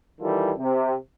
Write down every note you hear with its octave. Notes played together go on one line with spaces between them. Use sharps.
D#3 E3 G3 F4 A4
C3